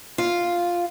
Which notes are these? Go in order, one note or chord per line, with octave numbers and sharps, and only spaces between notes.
F4